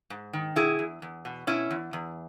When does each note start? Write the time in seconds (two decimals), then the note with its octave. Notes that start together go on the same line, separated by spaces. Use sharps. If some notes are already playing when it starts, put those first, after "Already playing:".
0.10 G#2
0.33 D#3
0.56 B2 E4 G#4
0.79 E2
1.02 E2
1.25 B2
1.47 B2 C#4 E4
1.70 E2
1.93 E2